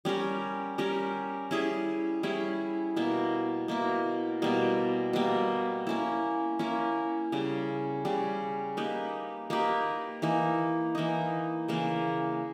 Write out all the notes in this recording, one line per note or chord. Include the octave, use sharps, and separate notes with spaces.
G3 C#4 G4 A#4
G3 C#4 G4 A#4
G3 C#4 E4 G#4
G3 C#4 E4 G#4
B2 A#3 E4
B2 A#3 E4
B2 G3 A#3
B2 G3 A#3
A#3 C#4 E4
A#3 C#4 E4
C#3 G3 C#4
C#3 G3 C#4
A#3 D#4 G4 B4
A#3 D#4 G4 B4
E3 A#3 D#4
E3 A#3 D#4
C#3 E3 A#3